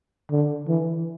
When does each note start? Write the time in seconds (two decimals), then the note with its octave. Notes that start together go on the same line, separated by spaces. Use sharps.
0.31 D3
0.68 E3